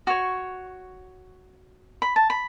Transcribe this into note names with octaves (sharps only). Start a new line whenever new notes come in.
F#4 C#5 C#6
B5
A5
B5